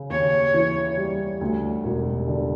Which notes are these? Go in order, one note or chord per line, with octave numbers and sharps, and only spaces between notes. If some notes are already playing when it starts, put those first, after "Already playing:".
Already playing: C#3
D#2 C#5
E3
G3
D2
E1
D3